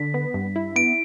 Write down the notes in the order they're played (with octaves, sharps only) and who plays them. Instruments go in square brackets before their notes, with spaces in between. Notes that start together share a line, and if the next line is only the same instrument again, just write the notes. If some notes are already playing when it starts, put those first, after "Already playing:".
Already playing: [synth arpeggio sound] D3 [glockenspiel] B6
[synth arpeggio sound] B3
G2
E4
[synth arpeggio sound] B3 [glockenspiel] D7